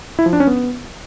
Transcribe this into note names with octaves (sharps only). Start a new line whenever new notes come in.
E4
F3
D4
C#4
B3